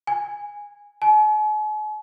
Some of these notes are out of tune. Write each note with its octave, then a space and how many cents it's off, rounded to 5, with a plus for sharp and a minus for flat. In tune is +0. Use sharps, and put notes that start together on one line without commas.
G#5 -10
G#5 +45